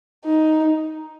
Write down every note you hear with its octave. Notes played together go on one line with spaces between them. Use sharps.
D#4